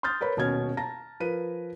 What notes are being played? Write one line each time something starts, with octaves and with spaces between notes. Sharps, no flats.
C6 D#6 F6 G6 A6
A#4 B4 C#5 B5
D#1 B2 C#4 F6 G#6
A5 A#5 A#6
F3 A#4 B4 D#7